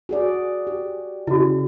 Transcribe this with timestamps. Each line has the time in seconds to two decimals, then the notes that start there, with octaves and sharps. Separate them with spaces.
0.09 F#4 G#4 D5
0.67 G4
1.27 C#3 E4 F#4